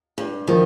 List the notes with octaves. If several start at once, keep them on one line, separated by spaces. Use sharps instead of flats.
G2
D#3 F3